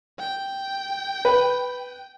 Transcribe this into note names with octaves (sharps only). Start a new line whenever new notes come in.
G5
B4